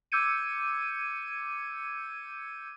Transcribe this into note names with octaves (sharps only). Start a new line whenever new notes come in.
D6 E6 G6 G#6 C#7 D#7